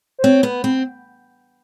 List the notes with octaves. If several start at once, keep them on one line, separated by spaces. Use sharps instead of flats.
C5
C4 C#5
B3
C4